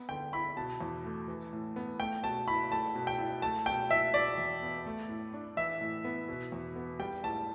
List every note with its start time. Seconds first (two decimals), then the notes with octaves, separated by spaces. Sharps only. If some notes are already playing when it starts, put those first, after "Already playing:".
Already playing: B3
0.09 D3 G5
0.33 E4 B5
0.57 B2 A5
0.81 E2
1.05 A3
1.28 E3
1.53 A2
1.76 B3
2.00 A3 G5
2.24 B2 A5
2.47 E4 B5
2.71 A3 A5
2.95 B2
3.07 G5
3.19 E4
3.42 A3 A5
3.66 B2 G5
3.90 E4 E5
4.14 B2 D5
4.38 E2
4.62 B3
4.86 A3
5.09 A2
5.34 D4
5.57 E3 E5
5.81 A2
6.05 B3
6.29 B2
6.52 E2
6.76 B3
6.99 G3 G5
7.23 A2 A5